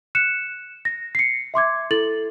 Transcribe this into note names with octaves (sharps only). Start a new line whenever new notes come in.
F#6 C#7 E7
A#6
C7 C#7
E5 C6 D6 G#6
E4 A4 A6 F#7